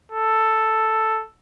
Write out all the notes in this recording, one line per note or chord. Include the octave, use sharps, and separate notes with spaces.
A4